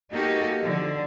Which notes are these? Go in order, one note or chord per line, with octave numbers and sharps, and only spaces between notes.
A#3 D#4 F#4 G4 A4
D3 F3